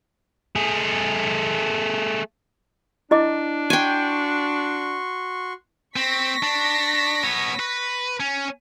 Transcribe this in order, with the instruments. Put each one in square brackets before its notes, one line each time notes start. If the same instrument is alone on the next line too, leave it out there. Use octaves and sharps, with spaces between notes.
[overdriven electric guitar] A3 G#4
[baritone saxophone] D4 [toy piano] E4 D#5 D6
[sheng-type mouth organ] F#4 C6 C#6 [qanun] G5 G#5
[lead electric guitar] C4 [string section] C#6 A#6 B6
[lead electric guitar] D4
B3 C#5
B4
C#4